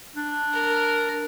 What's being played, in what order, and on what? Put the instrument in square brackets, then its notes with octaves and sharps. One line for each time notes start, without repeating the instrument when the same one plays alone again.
[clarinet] D4
[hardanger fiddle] A#4